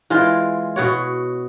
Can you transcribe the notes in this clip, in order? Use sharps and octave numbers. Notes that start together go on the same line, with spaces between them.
E3 G#3 F4 A#4
B2 F#4 C#5